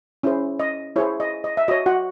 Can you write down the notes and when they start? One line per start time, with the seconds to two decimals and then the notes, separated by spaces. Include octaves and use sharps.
0.23 C#4 E4 G#4 C5
0.60 D#5
0.96 E4 G#4 C5 C#5
1.20 D#5
1.44 D#5
1.57 E5
1.68 F#4 C#5 D#5
1.86 F#4 F#5